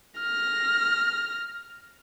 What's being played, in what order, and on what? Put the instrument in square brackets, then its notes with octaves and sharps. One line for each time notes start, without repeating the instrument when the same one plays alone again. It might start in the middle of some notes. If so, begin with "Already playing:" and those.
[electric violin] F6 A#6